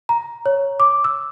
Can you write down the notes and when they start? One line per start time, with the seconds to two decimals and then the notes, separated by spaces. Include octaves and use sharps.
0.09 A#5
0.46 C#5
0.80 D6
1.04 E6